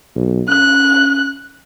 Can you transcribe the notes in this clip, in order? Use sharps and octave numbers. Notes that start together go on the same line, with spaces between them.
B1
C#4 F#6